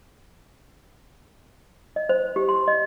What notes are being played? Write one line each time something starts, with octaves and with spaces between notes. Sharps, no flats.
D#5
C5
G4
C6
D#5